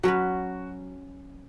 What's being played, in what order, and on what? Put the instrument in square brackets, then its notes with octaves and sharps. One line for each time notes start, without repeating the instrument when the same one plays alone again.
[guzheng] F#3 C#4 B4 [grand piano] F#4